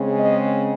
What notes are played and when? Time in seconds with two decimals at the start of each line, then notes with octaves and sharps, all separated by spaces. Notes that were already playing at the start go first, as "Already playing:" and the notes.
Already playing: C#3 G#3 C4
0.18 D#5